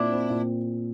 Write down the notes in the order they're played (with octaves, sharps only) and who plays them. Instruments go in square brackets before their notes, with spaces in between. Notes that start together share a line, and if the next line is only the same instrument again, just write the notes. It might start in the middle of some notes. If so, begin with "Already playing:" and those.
Already playing: [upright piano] A#2 C4 [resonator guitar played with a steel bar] D4 E4
[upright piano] C4
A#2